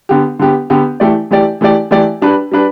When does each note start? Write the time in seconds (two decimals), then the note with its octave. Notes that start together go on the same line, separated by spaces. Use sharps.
0.09 D3 B3 G4
0.39 D3 B3 G4
0.70 D3 B3 G4
1.00 E3 A3 G4 D5
1.31 E3 A3 G4 D5
1.61 E3 A3 G4 D5
1.91 E3 A3 G4 D5
2.22 G3 D4 B4
2.52 G3 D4 B4